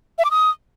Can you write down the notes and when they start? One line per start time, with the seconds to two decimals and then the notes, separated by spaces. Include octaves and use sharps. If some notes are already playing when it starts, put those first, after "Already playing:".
0.18 E5
0.25 D6
0.31 D#6